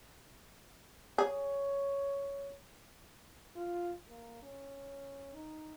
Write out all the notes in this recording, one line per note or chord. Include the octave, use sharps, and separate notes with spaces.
G#4 C#5
F4
A#3
C#4
D#4